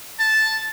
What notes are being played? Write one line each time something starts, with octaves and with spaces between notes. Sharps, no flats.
A5